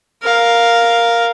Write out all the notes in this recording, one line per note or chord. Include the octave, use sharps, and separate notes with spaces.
A#4 F5